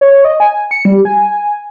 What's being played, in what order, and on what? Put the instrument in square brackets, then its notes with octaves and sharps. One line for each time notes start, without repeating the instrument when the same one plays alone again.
[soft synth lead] C#5
D#5
G#5
C#7
G3
G#5